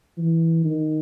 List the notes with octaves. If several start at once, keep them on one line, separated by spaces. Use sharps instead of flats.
E3
D#3